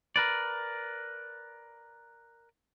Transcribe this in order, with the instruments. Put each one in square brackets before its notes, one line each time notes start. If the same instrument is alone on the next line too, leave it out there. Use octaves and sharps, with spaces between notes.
[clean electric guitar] A#4 B4 D5